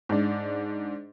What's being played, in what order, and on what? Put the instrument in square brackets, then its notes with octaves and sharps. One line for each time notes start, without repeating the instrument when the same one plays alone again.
[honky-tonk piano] G#2 D4